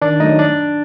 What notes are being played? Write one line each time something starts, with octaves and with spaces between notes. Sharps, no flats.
D#3 D4 D5
F#3 A3 D#4 D#5
D4 D5